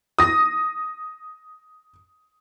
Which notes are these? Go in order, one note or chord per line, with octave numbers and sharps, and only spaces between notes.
D#6 A#6